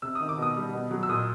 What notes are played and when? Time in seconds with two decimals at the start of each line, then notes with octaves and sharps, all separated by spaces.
0.02 C3 E6
0.15 D#3 D#6
0.29 D6
0.38 B2 D#6
0.56 G3
0.73 B2
0.91 F#3
1.03 E6
1.09 A#2 D#6